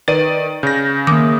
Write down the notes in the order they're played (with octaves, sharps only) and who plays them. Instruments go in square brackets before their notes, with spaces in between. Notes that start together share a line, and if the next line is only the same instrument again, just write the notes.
[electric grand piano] D#3 D5 D#7 [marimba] B4
[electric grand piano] C#3 A#6 [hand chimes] G6
[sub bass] D#3 [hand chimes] A#3 D#6 [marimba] D6